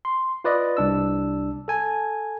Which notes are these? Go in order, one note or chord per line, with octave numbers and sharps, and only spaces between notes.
C6
F4 B4 D5 D#5
C2 D4 E6
A4 G#5 A5